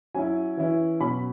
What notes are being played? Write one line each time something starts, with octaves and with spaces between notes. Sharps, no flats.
F#3 C#4 E4 G#5
E3 C#4 E4
B2 F#3 C#4 B5